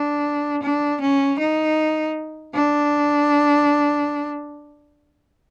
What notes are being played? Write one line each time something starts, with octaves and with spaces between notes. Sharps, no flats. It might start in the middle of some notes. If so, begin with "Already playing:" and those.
Already playing: D4
D4
C#4
D#4
D4